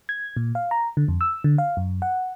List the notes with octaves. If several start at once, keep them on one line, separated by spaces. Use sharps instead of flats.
G#6
A#2
F5
A#5
D3
F2
E6
D3
F5
F#2
F#5